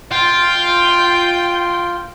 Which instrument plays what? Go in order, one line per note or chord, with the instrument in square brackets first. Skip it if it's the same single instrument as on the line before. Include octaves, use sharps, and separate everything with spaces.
[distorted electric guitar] F4 [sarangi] G5